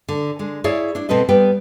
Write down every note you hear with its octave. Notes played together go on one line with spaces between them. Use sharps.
D3
D3 G#3
E4 G#4 C#5 D5 E5
D4 E4
B2 C4 A4 B4 D#5
G3 B3 B4 G5